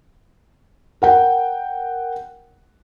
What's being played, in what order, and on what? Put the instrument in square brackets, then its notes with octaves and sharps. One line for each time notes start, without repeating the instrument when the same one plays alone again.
[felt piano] A#4 F#5 G5